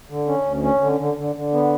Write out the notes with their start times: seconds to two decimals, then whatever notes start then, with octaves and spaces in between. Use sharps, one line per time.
0.10 D3
0.28 C#4
0.46 D2
0.63 C#4
0.81 D3
1.00 D3
1.17 D3
1.36 D3
1.53 B3